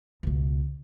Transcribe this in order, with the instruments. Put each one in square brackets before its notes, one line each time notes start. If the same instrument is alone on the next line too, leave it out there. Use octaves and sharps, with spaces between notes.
[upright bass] C#2 B2